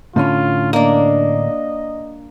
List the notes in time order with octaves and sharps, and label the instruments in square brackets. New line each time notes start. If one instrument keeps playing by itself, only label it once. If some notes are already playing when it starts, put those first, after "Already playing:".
[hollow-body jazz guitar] A2 D3 C#4 [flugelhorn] F4
[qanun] A#3 D4 [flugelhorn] D#5